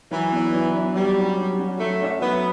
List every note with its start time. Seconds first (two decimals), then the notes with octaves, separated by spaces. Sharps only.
0.11 E3 F#3
0.32 B3 D4
0.53 F#3
0.75 B3 D4
0.95 F#3 G3
1.16 C#4 F#4
1.38 F#3
1.58 C#4 F#4
1.80 F#3 A3
2.01 C#4 F#4 C#5 E5
2.22 F#3 B3